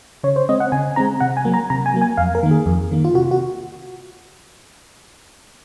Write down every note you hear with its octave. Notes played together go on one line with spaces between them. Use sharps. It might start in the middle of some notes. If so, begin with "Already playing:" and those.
C#3 C#5
C5
G#3 C4 D#5
F#5
C#3 G#5
G#3 C4 A#5
C3 F#5
G#5
F#3 A#3
A#5
C3 A#5
G#5
F#3 A#3
G#5
F2 F5
A#4
D#3 A#3
G#4
F2
D#3 A#3
F4
C3 F#4
F#4